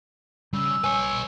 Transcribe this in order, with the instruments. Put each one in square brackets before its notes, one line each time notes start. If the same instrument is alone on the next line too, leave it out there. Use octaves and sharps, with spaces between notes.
[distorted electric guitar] C#3 [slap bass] G3 [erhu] E6
[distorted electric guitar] B4 C#5 [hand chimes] G#5